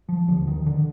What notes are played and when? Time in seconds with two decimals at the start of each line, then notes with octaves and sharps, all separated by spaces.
0.09 F3
0.28 D#2 D3 F3
0.47 D#3
0.66 D3